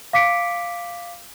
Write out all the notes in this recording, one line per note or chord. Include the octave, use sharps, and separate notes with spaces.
F5 D6 B6 C#7 D7